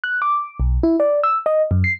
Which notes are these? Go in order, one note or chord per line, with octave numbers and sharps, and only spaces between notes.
F#6
D6
B1
E4
D5
E6
D#5
F#2
C7